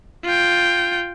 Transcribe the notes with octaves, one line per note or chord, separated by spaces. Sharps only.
F4 G5